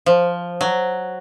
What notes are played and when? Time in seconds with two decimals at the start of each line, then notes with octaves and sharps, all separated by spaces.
0.06 F3
0.61 F#3